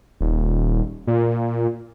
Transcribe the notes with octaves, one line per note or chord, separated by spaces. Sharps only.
D#1
A#2